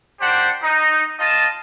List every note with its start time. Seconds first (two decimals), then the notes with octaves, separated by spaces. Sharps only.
0.20 D4 G4 C5 F#5
0.63 D#4
1.19 F4 D#5 A5